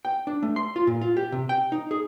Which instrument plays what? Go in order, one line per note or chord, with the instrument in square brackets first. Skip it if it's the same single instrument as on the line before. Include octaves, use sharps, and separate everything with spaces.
[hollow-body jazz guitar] G5
D4
A3
C6
F4
A#2
F4
G4
C3
G5
D#4
G#4